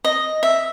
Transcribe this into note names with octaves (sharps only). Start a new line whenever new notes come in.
D#5
E5